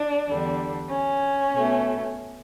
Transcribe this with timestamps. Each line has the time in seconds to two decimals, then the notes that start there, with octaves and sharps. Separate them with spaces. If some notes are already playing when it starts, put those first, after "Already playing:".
Already playing: D4
0.27 E2 D3 G3
0.89 C#4
1.53 B2 A3